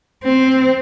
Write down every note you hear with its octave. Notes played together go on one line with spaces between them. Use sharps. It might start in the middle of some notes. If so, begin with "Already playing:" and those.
C4